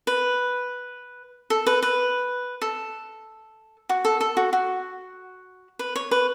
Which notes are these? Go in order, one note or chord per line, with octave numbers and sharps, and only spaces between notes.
B4
A4
B4
B4
A4
F#4
A4
A4
F#4
F#4
B4
C#5
B4